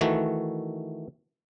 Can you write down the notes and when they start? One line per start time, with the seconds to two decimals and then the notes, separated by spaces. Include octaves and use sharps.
0.01 D#3 E3 A3 F#4